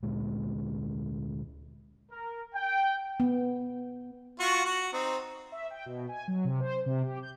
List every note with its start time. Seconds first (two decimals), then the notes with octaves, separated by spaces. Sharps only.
0.03 D2 A#2 G#3
2.11 A#4
2.55 G5
3.20 B3
4.40 F4 F#4 C#6
4.65 F#4
4.93 C4 D#4
5.52 E5
5.70 G5
5.86 B2
6.09 G#5
6.28 F#3
6.45 C3
6.60 C5
6.86 C3
7.03 G4
7.23 G6